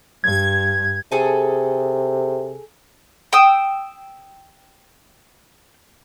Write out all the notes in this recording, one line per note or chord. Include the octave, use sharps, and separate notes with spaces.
G2 G#6
C3 G#4 A4 G#5
G5 D#6 E6